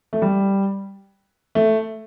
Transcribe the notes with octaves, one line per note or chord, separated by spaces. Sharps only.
A3
G3
A3